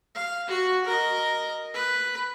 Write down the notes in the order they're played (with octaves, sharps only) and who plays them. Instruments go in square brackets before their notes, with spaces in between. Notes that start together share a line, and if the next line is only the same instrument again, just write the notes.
[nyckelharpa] F5
F#4 F#5
A#4 D#5
B4